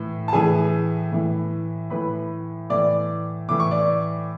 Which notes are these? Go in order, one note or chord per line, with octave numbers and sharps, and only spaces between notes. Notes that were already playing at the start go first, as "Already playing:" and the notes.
Already playing: A2 E3
A5
A2 E3 G#4 G#5
A2 E3
A2 E3 B4 B5
A2 E3 D5 D6
A2 E3 D6
C#6
D5 D6